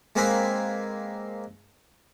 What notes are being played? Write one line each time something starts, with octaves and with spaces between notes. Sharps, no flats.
G#3 A#3 C4 B4 G#5